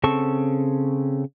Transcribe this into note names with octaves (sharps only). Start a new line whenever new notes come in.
C#3 C4 A4 A5 C#6